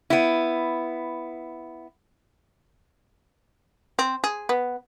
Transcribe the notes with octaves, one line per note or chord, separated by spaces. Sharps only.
B3 E4
C4
G#4
B3